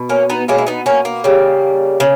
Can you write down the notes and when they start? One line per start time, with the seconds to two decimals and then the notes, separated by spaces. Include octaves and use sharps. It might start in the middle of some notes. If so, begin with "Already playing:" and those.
Already playing: B2
0.09 A#3 C#4
0.30 B3 D#4
0.48 B2 G#3 A#3 C#4
0.58 E4
0.67 B3 D#4
0.86 A#3 C#4
1.05 A#3
1.24 C#3 G3
2.00 C#3